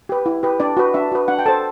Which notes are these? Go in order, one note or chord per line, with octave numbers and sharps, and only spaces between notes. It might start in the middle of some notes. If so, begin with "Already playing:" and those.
G4 B4
E4
G4 B4
D4 D5
F#4 B4
D4 E5
F#4 B4
D4 F#5
G5
A4 C5 A5